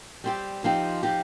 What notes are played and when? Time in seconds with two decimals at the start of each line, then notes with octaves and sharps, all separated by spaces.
0.24 G3 C4 G4
0.64 F3 C4 D#4 G4
1.03 F3 C4 D#4 G4